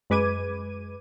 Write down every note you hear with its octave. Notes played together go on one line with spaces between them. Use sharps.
F#2 G#3 B4 D6 G#6 D#7